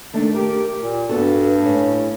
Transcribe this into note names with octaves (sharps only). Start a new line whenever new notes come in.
D#3 A3 D4
G4 A#4
A#2
G2 B3 F#4 A4
A2 C#4